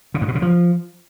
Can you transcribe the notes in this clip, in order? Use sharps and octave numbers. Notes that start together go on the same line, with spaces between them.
C#3
G2
B2
C#3
F3